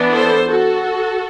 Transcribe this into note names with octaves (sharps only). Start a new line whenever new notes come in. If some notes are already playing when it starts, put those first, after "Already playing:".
Already playing: E3 B3 D4
A4 C5
F#4 A4